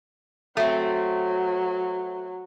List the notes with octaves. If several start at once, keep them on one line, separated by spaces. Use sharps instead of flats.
F#3 A3 C4